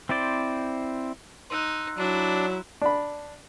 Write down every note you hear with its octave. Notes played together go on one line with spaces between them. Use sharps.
C4 E4 C5 D5
D#4 C6 E6 F#6
F#3 D4 E4 A#5
D4 B5